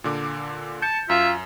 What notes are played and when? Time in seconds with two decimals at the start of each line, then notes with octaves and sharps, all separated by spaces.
0.04 A#2 D3 D6
0.82 A5 G6 C#7
1.10 F#2 F4 E5